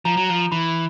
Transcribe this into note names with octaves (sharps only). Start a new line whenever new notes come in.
F3 A#5
F#3
F3
E3 B5